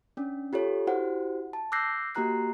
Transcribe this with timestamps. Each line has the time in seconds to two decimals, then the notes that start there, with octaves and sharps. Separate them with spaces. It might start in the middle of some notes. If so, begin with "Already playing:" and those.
0.17 C#4 D4
0.53 F4 G4 A4 C#5
0.87 E4 F#4 G4 C5 F#5
1.53 A5
1.72 D6 E6 F#6 G6 A#6 C7
2.15 A#3 F#4 G4 A#5 F#6 C7